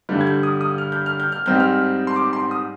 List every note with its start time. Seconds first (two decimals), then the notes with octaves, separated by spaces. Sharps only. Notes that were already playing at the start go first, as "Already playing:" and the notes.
0.09 G2 D3 G3
0.21 G#6
0.27 G6
0.43 D#6
0.61 D#6
0.78 F6
0.92 G6
1.06 F6
1.20 G6
1.32 F6
1.46 G#2 G3 C4 D#4 G6
1.60 F6
2.07 C6
2.16 D6
2.33 C6
2.51 D#6